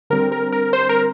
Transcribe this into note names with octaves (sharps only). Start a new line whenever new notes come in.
D3 G3 C4 A#4
A#4
A#4
C5
A#4